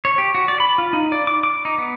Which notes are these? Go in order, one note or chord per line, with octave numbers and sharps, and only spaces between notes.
C#5
G4
F#4
D5
B5
F4
D#4
D5
D6
D6
D#4
B3